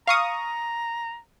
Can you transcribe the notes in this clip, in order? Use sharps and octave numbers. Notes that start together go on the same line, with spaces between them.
F5 A#5 C#6 D#6